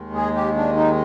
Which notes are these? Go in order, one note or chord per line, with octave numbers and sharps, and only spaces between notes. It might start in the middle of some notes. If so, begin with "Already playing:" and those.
Already playing: D#2 D#3 G#3
G#4
G4
D4
D#4